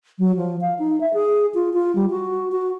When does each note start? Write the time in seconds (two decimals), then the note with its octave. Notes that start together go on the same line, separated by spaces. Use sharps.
0.19 F#3
0.37 F3
0.61 F5
0.79 D#4
1.01 E5
1.14 G#4
1.54 F4
1.73 F4
1.95 G3
2.10 F#4
2.52 F#4